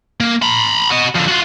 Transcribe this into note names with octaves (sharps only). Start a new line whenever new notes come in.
A#3
A#5 B5
F#4 D#5
F2 D3
F4 F#4